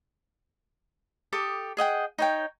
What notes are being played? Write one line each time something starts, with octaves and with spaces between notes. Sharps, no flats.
G4 A4 D6 D#6
G#4 D#5 F#5 G5
D#4 C#5 G5